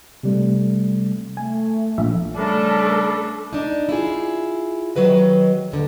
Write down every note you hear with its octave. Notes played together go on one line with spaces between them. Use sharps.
C3 G3 A3
A3 G#5
A#1 E5
C#3 G3 A3 D4 A4 A#4
D4 D#4
E4 F4 G#4
D#3 F#3 G#3 B4 D#5
D#2 D3